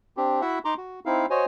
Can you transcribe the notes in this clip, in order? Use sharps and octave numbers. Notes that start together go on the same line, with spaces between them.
C4 D4 G4
E4 F#4 E5 F#5
D#4 A#5 C6 D6
F#4
C4 D#4 E4 F5
F#4 C5 C#5 D#5 G#5